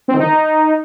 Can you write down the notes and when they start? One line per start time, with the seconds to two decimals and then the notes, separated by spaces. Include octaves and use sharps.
0.08 C4
0.14 D#3
0.20 D#4